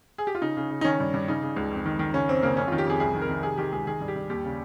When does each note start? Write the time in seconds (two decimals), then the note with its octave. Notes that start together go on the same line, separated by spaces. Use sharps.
0.18 G#4
0.27 G4
0.35 F4
0.41 C#3 D#4
0.57 C#3
0.70 C#3
0.81 D#4
0.84 D#3 C#4
1.00 G2
1.14 G2
1.28 C#3 D#4
1.42 C#3
1.56 C#2
1.71 F2
1.85 D#3
1.99 D#3
2.14 C#3 C#4
2.29 F2 C4
2.43 C#3 A#3
2.57 F2 C#4
2.68 D#3 F4
2.78 G4
2.87 F2 G#4
3.00 C2 G#4
3.14 D#3
3.22 A#4
3.29 D#3
3.43 C3 G#4
3.58 D#3 G4
3.72 C#2 G#4
3.87 D#3 G#4
4.01 G2
4.08 G4
4.16 G2
4.30 D#2 G4
4.44 C#3